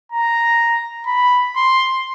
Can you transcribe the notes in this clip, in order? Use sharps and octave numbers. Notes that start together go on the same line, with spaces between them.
A#5
B5
C6